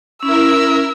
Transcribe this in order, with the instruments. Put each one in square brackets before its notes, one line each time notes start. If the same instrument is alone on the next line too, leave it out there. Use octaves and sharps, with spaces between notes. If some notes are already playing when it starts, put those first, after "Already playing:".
[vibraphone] C#4 [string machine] E4 A#4 [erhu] E6